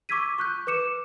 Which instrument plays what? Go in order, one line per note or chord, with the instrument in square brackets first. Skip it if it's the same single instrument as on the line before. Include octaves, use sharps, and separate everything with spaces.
[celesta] C#6 D6 E6 G#6 B6 D#7
C#6 F#6 G6
B4 D6 C#7 E7